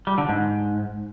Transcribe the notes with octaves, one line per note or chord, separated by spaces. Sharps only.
G3
D3
G#2